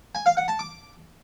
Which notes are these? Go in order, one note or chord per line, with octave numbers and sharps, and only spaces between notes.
G#5
F5
F#5
A5
D6